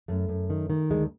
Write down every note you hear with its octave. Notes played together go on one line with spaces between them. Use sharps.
F#2 A3
F#2
D#3
D#3
D2 G#3